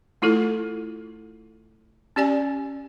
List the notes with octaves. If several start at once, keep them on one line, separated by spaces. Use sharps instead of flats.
A3 E4 F4 A4
C#4 G4 D5 G#5